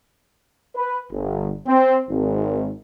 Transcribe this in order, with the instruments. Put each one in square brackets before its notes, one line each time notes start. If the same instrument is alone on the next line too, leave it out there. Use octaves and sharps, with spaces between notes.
[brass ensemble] B4
G1
C4
G#1